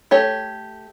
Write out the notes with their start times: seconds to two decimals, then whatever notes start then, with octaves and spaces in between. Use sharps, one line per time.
0.11 A3 G4 C#5